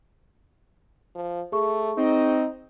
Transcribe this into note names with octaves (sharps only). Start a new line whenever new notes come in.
F3
A3 G#4 C#6
C4 D#4 D#5